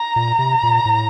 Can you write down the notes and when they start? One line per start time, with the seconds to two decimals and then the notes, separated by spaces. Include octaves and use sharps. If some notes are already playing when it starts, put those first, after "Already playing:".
Already playing: A#5
0.16 A#2
0.39 C3
0.63 A#2
0.85 A2